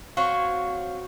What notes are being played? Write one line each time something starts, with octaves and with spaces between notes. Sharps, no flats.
C4 F#4 C#5 F5 C#6